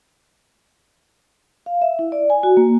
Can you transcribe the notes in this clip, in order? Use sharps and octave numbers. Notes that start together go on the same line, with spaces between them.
F5
E5
E4
D5
G#5
F#4
A#3